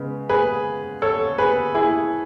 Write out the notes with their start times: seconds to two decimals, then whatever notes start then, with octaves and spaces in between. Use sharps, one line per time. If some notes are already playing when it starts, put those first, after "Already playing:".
Already playing: C#3 G#3 B3
0.29 G#4 B4
1.02 A4 C#5
1.38 G#4 B4
1.75 E4 G#4